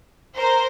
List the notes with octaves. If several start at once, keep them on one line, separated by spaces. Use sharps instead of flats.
A#4 C5